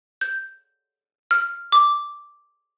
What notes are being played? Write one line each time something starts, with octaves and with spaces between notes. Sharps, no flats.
G6
F6
D6